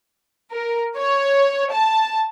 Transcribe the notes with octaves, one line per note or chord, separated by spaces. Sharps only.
A#4
C#5
A5